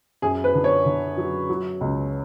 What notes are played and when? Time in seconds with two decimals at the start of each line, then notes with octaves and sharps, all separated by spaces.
0.22 F#2 G#4
0.44 B4
0.55 D3
0.64 C#5
0.86 D3
1.17 F#3
1.49 F#3
1.81 C#2